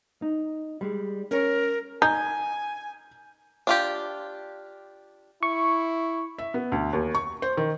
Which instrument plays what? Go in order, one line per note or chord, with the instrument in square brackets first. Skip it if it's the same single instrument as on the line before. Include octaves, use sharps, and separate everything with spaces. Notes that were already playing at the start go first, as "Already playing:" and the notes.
[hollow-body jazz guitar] D#4
G3 G#3
[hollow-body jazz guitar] C#4 C#5 [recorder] A#4
[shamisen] D#4 [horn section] G#5 [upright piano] G6
[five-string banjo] D4 F4 G4
[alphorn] E4 [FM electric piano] C#6
[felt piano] E5
B3
D2
D#2
C#6
C5
D#3